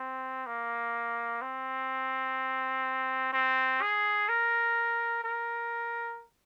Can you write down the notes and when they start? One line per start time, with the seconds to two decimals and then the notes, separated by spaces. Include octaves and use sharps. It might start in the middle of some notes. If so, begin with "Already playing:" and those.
Already playing: C4
0.46 A#3
1.42 C4
3.33 C4
3.82 G#4
4.29 A#4
5.24 A#4